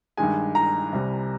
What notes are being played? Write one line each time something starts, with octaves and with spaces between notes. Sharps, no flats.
G2 D#3 G#3 G#5
A#5
C2 C3 G3